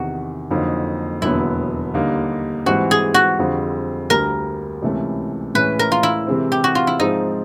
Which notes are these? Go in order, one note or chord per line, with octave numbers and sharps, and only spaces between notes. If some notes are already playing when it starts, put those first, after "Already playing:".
Already playing: E2 C3 D#3 F#4
F2 D3 F#3 A#3 D#4
E1 D#2 D3 F#3 B3 E4
D#2 D3 G3 A#3 D#4
G#2 E3 G3 C4 F#4
G#4
F#4
F2 D3 G3 C4 F4
D2 D3 G3 A#4
C#2 C3 E3 A3 C#4
A2 E3 G#3 C#4 B4
A#4
F4
E4
C3 E3 G#3 C4
G4
F#4
F4
E4
G#2 F3 G#3 C4 D#4 F4